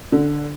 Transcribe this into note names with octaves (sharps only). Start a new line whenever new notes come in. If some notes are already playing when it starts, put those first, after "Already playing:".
D3